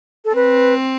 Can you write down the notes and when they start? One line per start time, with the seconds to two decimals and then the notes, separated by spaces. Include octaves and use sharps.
0.25 A4
0.35 C4 B4